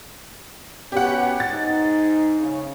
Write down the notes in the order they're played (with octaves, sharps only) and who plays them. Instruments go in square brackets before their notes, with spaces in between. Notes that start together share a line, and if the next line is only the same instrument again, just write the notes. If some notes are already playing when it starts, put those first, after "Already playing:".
[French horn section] B3 C#4 F#4 [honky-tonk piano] G4 F#5
[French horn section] G#2 D#4 [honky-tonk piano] A6
[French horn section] C#3